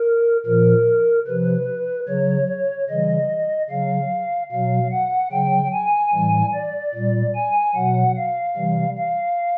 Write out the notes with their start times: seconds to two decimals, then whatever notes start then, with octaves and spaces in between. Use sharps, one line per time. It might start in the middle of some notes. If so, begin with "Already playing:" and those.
Already playing: A#4
0.45 A#2 F3 A#4
1.27 C3 F3 B4
2.08 C#3 F#3 C#5
2.48 C#5
2.89 C#3 E3 G3 D#5
3.70 C#3 F#3 F5
4.51 B2 F#3 F5
4.91 F#5
5.32 C#3 F#3 G5
5.73 G#5
6.13 A2 E3 G3
6.54 D5
6.94 A#2 G3
7.35 G#5
7.75 B2 F#3 F#5
8.16 F5
8.57 C3 E3 G3
8.97 F5